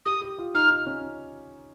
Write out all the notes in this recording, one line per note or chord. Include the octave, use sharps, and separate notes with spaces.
G4 D#6
G4
F4
D#4 F6
D#4
C#4